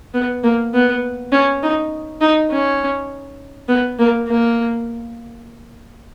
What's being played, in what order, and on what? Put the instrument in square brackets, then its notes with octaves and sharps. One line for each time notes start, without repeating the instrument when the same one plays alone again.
[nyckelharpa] B3
A#3
B3
C#4
D#4
D#4
C#4
B3
A#3
A#3